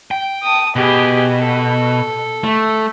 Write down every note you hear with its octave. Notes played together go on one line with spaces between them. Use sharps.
G5
A5 D#6
B2 G4 G#4
A4
A3